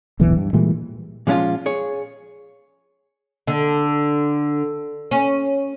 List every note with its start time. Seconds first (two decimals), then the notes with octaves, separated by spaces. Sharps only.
0.20 D1 B1 E2 E3
0.37 G2
0.53 A#2 E3 G3 G#3
1.27 A#2 F3 G#3 C#4 D#4 F4
1.66 G#4 C#5
3.47 D3
5.11 C#4